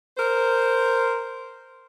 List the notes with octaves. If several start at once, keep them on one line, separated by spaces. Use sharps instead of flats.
A#4 C5